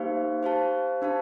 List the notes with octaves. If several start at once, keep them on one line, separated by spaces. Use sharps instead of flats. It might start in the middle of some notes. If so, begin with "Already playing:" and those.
Already playing: A#3 D#4 G4 C5 F5
G4 C5 F5 A5
D4 G4 C5 F5 A5